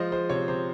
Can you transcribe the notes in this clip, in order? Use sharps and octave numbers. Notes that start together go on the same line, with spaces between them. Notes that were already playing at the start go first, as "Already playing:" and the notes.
Already playing: F3 G#3 C5 D#5
G#3 C5
C3 C#5
C3 C5